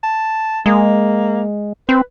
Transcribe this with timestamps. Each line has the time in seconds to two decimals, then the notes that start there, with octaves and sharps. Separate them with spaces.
0.04 A5
0.66 G#3 A#3
1.89 C4 B4